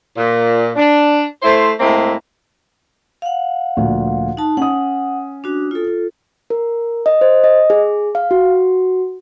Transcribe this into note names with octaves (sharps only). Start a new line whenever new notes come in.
A#2
D4
A3 E4 C5
A2 G#3 A#3 C4 E4
F5 F#5
D2 A#2 F3
D#4 A5
C#4 F#5 D#6
D4 F#4
F4 A4
A#4
D#5
C5
D#5
G#4
F5
F#4